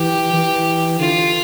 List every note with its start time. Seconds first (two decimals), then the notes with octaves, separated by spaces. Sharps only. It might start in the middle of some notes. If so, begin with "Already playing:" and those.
Already playing: E3 G4
0.33 E3
0.99 D3 F4